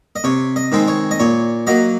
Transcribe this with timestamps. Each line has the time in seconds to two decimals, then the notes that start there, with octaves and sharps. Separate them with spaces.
0.16 D#5
0.24 C3 C#5
0.56 D#5
0.72 D#3 G#3 C4
0.88 C#5
1.11 D#5
1.20 A#2 C#5
1.67 F#3 A#3 D#5